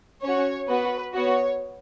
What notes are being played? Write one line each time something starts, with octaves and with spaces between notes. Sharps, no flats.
C#4 F#4 C#5
B3 F#4 B4
B3 F#4 C#5